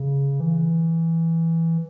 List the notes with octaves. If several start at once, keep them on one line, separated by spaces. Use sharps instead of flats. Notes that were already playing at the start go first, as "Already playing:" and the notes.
Already playing: C#3
E3